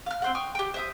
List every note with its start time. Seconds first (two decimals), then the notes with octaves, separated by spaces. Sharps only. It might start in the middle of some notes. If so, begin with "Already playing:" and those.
0.06 F5 F6
0.22 C4 C5 F#5
0.35 G5 C#6 D#6 F6
0.55 G4 G5
0.74 C5 E5 D#6